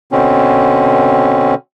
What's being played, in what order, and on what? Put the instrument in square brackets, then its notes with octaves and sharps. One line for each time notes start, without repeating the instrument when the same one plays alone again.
[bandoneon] B2 D3 C4 C#4